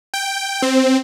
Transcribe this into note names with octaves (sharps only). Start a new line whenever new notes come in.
G5
C4